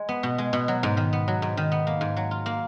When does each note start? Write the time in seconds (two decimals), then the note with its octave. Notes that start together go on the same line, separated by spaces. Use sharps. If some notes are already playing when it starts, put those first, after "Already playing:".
Already playing: G#3
0.09 B3
0.23 B2
0.38 G#3
0.53 B2
0.68 F#3
0.83 G#2
0.97 D#3
1.13 B3
1.28 F#3
1.42 G#2
1.57 D#3
1.72 B3
1.87 A#3
2.01 G#2
2.17 F#3
2.31 F4
2.46 A#3